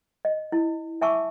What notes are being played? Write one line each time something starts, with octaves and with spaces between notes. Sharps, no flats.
D#5
E4
E5 G#5 A5 C#6 D6 E6